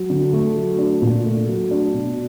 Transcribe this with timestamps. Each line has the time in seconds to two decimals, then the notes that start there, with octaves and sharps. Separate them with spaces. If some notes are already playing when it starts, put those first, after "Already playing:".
Already playing: F#3
0.10 D3
0.33 A3
0.56 F#3
0.79 D4
1.02 A#2
1.25 A3
1.48 F#3
1.71 D4
1.94 B2